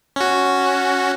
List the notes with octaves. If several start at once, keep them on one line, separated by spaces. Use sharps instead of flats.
C#4 F#4